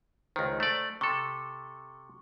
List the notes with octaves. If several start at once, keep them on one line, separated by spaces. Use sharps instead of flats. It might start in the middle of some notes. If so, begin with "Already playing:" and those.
C#2 D#3 C5
A3 D5
C3 A4 C#6